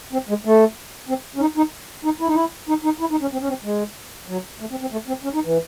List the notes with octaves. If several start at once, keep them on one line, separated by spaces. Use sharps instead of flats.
C4
G#3
A3
C4
C#4
D#4
D#4
D#4
E4
D#4
E4
D#4
D#4
E4
D#4
C#4
C4
C#4
C4
G#3
F#3
A3
C4
C4
A3
C4
C#4
D#4
E3